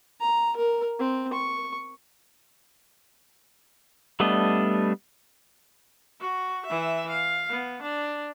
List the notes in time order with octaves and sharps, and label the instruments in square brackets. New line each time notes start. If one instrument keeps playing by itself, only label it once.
[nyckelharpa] A#5
A#4
C4
C#6
[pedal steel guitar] G3 A3 B3 D4 D#5
[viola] F#4
E3 E5
F5
B3
D4